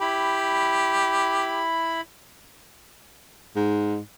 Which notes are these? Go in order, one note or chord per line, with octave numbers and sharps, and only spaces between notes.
E4 G4 B5
G#2